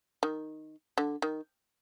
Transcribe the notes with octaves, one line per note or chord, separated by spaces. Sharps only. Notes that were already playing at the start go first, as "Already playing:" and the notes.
D#3
D3
D#3